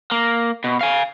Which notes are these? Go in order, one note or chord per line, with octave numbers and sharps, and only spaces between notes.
A#3
B2
F5 G#5